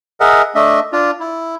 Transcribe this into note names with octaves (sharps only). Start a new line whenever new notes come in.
G#4 A#4 D#5 E5 F#5
A3 D4 D#5 E5
D4 F4
E4